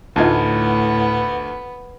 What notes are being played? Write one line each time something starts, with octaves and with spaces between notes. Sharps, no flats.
D2 A2 B3 D#4 F4 A5 G#6